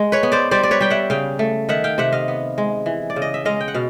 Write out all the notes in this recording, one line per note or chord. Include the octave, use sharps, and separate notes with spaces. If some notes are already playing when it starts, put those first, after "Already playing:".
Already playing: G#3
B4 C#5
B3
C5 D5
G3 C5 D5
D5
B4 C#5
G3 G5
E5 F#5
C#3 F5 G5
A3
D#3 E5 F#5
F5 G5
C3 E5 F#5
D#5 F5
B3
G#3
E3
D5
C#3
D#5
E5
G#3 D#5 F5
G5
F#5
B2 F5